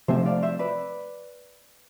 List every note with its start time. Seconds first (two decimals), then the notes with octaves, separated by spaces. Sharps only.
0.08 C3 F3 A3 C4 C5 E5
0.26 D5 F5
0.42 C5 E5
0.59 B4 D5